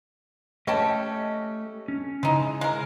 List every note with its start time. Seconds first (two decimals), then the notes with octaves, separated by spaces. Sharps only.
0.67 A3 C#4 G4 D#5 G5 A5
1.88 C#4
2.23 C#3 G#3 D#4 E4
2.61 G#3 A#4